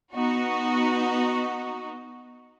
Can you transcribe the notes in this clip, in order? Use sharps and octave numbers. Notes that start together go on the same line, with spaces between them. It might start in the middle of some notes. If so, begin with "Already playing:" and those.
B3 D#4 F#4